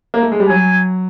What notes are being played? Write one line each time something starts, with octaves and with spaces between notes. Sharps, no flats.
A#3
A3
G#3
G3
F#3 G#5